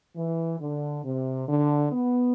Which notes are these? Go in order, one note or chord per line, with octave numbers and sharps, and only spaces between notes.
E3
D3
C3
D3
B3